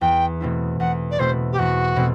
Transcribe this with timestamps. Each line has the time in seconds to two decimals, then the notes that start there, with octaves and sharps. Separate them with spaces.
0.01 E2 G5
0.41 B2 A3 C4 E4
0.80 E2 F#5
1.11 D5
1.19 B2 A3 C4 E4 C5
1.52 G4
1.59 E2 F#4
1.96 B2 A3 C4